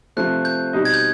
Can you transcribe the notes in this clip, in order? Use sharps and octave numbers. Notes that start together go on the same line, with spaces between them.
C3 F3 A3 C4 F#6
G6
B2 G3 C4 D#4
G#6
G6